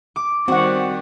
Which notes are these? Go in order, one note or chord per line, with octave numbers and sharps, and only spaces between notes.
D6
D#3 G3 C4 F#4 F#5